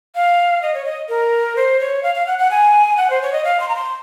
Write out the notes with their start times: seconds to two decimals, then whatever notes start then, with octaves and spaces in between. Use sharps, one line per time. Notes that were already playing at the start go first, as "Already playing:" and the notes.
0.15 F5
0.62 D#5
0.74 C#5
0.85 D#5
1.09 A#4
1.56 C5
1.80 C#5
2.03 F5
2.15 F5
2.27 F#5
2.38 F#5
2.51 G#5
2.97 F#5
3.10 C5
3.22 C#5
3.33 D#5
3.44 F5
3.60 C6
3.69 A#5
3.76 C6